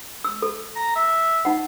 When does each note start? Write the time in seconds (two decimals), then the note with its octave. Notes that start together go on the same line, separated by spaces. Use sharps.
0.24 E6
0.42 A4
0.76 A#5
0.96 E5
1.45 D#4 F#5